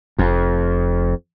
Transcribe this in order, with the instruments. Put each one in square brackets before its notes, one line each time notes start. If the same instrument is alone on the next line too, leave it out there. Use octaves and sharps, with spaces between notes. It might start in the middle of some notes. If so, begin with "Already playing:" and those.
[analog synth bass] F1 [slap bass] F2